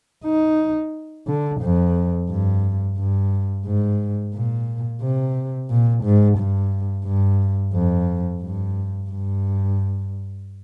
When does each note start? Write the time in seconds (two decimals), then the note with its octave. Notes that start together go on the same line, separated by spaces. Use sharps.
0.25 D#4
1.28 D3
1.62 F2
2.29 G2
2.98 G2
3.66 G#2
4.34 A#2
5.02 C3
5.70 A#2
6.04 G#2
6.38 G2
7.06 G2
7.74 F2
8.42 G2
9.11 G2